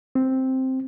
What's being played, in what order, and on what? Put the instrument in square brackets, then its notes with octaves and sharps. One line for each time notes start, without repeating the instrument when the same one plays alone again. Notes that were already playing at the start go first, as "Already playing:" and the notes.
[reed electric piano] C4